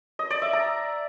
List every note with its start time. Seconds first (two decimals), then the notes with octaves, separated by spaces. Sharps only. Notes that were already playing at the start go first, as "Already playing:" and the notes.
0.19 D#5
0.30 D5
0.42 E5
0.53 A#5